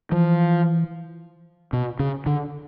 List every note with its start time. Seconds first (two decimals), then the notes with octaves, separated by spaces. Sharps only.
0.12 E3 F3
1.73 B2
1.99 C#3
2.26 D3